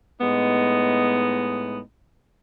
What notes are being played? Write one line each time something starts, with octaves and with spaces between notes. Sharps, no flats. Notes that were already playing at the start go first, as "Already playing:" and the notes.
A2 G#3 B3 D#4